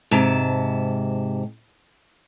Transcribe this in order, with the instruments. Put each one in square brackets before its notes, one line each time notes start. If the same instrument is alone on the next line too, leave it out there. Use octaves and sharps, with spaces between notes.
[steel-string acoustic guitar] G#2 C3 A5